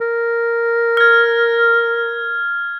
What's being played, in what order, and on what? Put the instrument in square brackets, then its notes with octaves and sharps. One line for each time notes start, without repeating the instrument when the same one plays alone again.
[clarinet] A#4
[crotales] F6 G#6